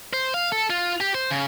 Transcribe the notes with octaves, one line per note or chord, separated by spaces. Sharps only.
C5
F5
A4
F4
G4
C5
C#3